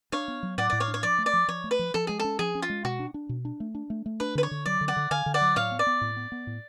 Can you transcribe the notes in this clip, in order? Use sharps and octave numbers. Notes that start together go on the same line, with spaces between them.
D4 C#5 F5
B3
F#3
A2 D5 F#5
A2 D5
C#5 F5
D4
C#5
F3 D5
A3
D5
F3
F3 C#5
A3
B4
F3
F3 A4
G#3 G#4
C#4 A4
F3 G#4
C#4
F4
G#3
B2 F#4
D4
D4
B2
D4
A3
D4
A3
A3
D4 B4
D3 B4
C#5
D3
F#3 D5
D3
D5 F#5
D3
D3 F5 G#5
D3
D5 F#5
F#3
A2 C#5 F5
B3
D5
B3
A2
B3
B3
A2